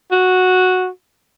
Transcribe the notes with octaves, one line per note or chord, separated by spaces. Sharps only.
F#4